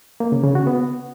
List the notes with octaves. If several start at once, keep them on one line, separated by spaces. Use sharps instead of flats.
A#3
C#3
C#3
F#4
B3